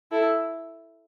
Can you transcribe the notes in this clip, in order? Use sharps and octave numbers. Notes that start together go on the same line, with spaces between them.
E4 A4